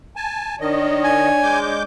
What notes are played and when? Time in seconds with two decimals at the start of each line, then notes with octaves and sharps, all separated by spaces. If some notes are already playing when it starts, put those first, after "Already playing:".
0.16 G#5 A5
0.61 D#3 D4 C#5 D#5
1.04 G#5
1.43 G#3 D6 G6